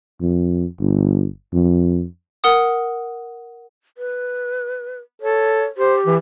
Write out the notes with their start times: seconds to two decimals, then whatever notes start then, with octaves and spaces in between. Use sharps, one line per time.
0.22 F2
0.80 G1
1.53 F2
2.44 A#4 F#5 D#6
3.98 B4
5.22 A4 C#5
5.77 G4 C5
6.06 E3